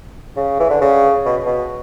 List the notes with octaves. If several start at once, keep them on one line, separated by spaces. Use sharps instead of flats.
C#3
E3
D3
C#3
B2
B2